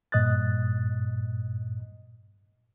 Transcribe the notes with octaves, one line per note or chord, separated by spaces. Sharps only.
G2 A#2 D#5 D#6 F#6 A6